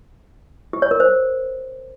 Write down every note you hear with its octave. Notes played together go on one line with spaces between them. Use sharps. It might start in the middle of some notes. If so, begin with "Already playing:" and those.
G4
C#5
A#4
C5